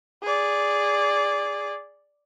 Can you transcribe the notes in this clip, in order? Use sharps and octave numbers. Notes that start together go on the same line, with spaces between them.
G#4 D5